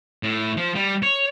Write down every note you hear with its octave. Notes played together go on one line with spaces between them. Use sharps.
A2
F3
G3
C#5